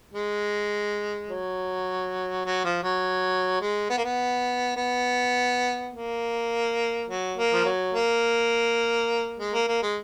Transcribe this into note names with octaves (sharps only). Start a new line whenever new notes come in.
G#3
F#3
F#3
F3
F#3
G#3
B3
A#3
B3
B3
A#3
F#3
A#3
F3
F#3
A#3
G#3
A#3
A#3
G#3